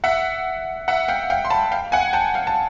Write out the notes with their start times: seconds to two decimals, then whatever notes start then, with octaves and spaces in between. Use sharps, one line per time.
0.04 E5 F#5
0.88 E5 F#5
1.08 F5 G5
1.30 F5 G5
1.45 C6
1.50 A5 B5
1.72 F5 G5
1.92 F#5 G#5
2.13 G5 A5
2.34 F5 G5
2.47 A5